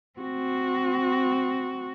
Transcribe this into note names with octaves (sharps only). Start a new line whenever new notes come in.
C4 F#4